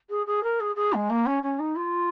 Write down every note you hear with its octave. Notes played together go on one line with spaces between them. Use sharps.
G#4
G#4
A#4
G#4
G#4
G#3
A#3
C#4
C#4
D#4
F4